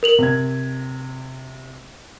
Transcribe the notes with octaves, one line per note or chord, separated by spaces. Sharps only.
A#4 F7 F#7
C3 G#6